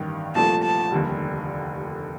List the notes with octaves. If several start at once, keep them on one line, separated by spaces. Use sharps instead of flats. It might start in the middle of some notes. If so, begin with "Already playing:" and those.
Already playing: A1 G2 D#3
C2 A#2 F3 A3 A5
A5
F1 D#2 D3 G3